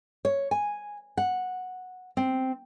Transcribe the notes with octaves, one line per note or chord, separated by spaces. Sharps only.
C#5
G#5
F#5
C4